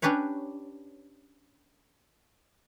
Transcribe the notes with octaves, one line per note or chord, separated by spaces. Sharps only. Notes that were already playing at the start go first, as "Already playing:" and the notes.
C#4 D4 G4 B4 C#5